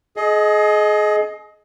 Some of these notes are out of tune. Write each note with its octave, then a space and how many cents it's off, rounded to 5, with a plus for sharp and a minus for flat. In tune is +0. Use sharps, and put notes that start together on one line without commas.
G#4 +35 D#5 +5